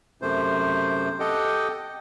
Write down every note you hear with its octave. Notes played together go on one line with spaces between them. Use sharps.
F#2 C3 A3 C5
G4 A4 D#5 F#5 G5